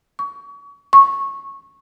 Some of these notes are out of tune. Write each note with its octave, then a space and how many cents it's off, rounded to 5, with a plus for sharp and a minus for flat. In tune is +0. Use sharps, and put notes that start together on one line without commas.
C#6 +30
C#6 -10